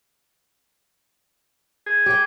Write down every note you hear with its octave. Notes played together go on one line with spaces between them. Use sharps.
G#4
G4 G5